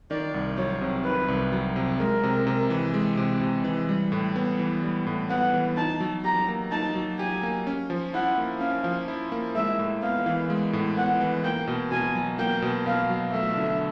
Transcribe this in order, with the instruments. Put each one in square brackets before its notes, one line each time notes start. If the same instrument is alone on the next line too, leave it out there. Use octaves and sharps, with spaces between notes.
[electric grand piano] D#3 [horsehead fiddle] D5
[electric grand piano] C2
[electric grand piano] F#3 [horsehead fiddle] C#5
[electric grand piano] C3
[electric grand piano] D#3 [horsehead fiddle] B4
[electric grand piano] C2
F#3
C3
[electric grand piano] G#3 [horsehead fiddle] A#4
[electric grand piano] C3
C3
E3
G#3
C3
C3
E3
G3
A2
B3
E3
G3
A2
[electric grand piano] B3 [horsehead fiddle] F#5
[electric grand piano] E3
[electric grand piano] D#4 [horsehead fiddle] A5
[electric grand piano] F#3
[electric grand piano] G4 [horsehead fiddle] A#5
[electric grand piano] A#3
[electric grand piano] D#4 [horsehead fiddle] A5
[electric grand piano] F#3
[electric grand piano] G4 [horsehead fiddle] G#5
[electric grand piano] A#3
C#4
F3
[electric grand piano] E4 [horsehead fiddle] F#5
[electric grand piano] A#3
[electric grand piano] C#4 [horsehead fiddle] F5
[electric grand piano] F3
E4
A#3
[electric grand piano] G#3 [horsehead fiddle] E5
[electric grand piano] A2
[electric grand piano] B3 [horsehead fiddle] F5
[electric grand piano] E3
G#3
A2
[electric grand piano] B3 [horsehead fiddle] F#5
[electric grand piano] E3
[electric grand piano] A#3 [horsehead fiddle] G5
[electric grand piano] B2
[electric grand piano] B2 [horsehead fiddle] G#5
[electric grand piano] F#3
[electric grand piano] A#3 [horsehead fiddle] G5
[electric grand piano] B2
[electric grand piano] B2 [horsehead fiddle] F5
[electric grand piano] F#3
[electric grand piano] A3 [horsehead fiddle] E5
[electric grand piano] D3